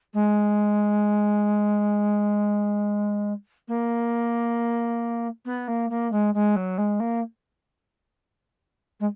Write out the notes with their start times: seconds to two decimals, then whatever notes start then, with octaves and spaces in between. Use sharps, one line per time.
0.14 G#3
3.68 A#3
5.45 B3
5.68 A#3
5.90 A#3
6.12 G#3
6.34 G#3
6.56 F#3
6.78 G#3
7.00 A#3
9.00 G#3